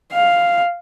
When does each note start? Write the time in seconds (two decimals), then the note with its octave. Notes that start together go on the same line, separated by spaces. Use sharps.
0.13 F5